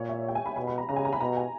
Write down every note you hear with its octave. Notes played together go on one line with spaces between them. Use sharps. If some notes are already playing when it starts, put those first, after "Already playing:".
Already playing: A#2 C#5
E5
G5
G#5
B5
B2 B5
B5
A#5
C#3 A#5
G#5
A#5
B5
B2 A#5
G#5